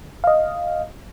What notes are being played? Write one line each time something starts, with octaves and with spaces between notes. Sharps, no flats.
D#5 F5